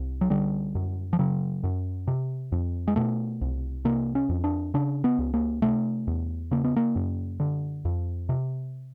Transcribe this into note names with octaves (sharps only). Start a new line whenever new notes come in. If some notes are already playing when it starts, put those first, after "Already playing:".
Already playing: C2
F#3
D3 G3
F#2
F3
C#3 F#3
F#2
C3
F2
G#3
B2 A3
C2
C3 A#3
C#4
F2
D4
C#3 D4
B3
C#2
A#3
C3 A3
E2
C#3 A#3
B3
A#3
F#2
D3
F2
C3